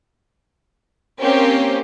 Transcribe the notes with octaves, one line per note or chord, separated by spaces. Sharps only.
A#3 C4 C#4 G4